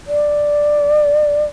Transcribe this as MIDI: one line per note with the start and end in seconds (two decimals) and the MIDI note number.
0.07 1.44 74